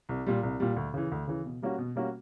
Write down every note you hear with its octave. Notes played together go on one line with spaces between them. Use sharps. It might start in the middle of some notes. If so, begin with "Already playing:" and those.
C2
A#2 G3
C2
A#2 G3
D2
C#3 E3
D2
C#3 E3
B2
G3 A#3 C#4 F#4
B2
G3 A#3 C#4 F#4